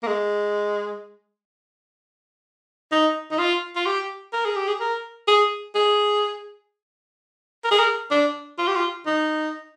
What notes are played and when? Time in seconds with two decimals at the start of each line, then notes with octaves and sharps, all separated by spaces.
0.03 A#3
0.07 G#3
2.92 D#4
3.31 D#4
3.39 F4
3.76 F4
3.86 G4
4.33 A#4
4.45 G#4
4.56 G4
4.68 G#4
4.81 A#4
5.28 G#4
5.75 G#4
7.64 A#4
7.71 G#4
7.79 A#4
8.11 D4
8.58 F4
8.67 G4
8.76 F4
9.07 D#4